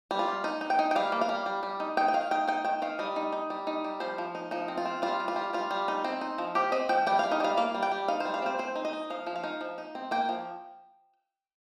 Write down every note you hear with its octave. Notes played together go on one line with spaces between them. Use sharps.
G3
F4
G3
D#4
D#4
G5
D#4
G5
G3 F5
A#3
F5
G3
G3
G3
D#4
D#4 G5
G5
D#3 F5
D#4 G5
D#4 G5
D#3 G5
D#3 F5
G3 D#5
D#4
D#4
G3
D#4
G3
F3 C5
F3
D#4
F3 D#4
C4
F4
C4
G3 F4
G3
F4
G3
G3 F4
G3
D#4
C4
D#4
F3
F3 G4
C4 D#5
F3 G5
G3 G5
G3 F5
D#4
G3 F5
A#3 F5
G3
G5
G3
D#4 F5
G3 C5
F5
C4 C5
C4 C5
D#4
D#5
D#4
F3 F5
F3
F5
D#4
F3
D#4
C4
A#3 G5
F3